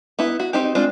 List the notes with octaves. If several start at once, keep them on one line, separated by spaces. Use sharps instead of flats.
B3 E4
F#4
C4 D#4 G4
G#3 C4 D4 F4